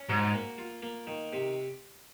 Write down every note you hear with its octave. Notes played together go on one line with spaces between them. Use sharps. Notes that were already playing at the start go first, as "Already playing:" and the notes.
Already playing: C#4
G#2 F#4
A#3
F4
A#3
D#3
C3